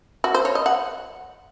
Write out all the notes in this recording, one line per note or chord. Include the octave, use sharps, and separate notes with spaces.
F#4
C5
C#5
D#5
F#5